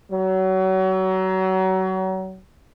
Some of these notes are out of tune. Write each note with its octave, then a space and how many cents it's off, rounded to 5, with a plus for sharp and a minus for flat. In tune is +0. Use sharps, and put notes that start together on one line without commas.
F#3 +30